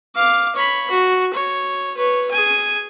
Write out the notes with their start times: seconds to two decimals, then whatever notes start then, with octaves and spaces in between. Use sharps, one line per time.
0.16 F5 D6
0.56 C#5 B5
0.90 F#4
1.33 C#5
1.97 B4 C#5
2.31 G#4 G#5